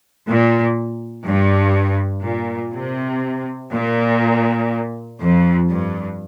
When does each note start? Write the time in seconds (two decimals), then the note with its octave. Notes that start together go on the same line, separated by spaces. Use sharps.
0.28 A#2
1.27 G2
2.25 A#2
2.74 C3
3.72 A#2
5.21 F2
5.70 G2